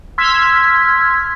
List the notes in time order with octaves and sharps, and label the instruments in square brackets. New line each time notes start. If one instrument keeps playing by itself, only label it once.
[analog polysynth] C6 E6 F6 G#6 B6